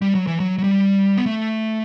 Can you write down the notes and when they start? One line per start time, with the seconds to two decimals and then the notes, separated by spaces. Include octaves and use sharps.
0.02 G3
0.15 F#3
0.27 E3
0.40 F#3
0.58 F#3
0.64 G3
1.17 B3
1.26 A3